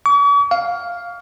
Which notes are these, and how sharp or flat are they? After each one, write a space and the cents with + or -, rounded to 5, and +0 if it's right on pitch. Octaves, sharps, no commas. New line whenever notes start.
C#6 +45
F5 +5